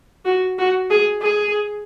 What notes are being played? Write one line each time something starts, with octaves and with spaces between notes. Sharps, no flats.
F#4
F#4
G#4
G#4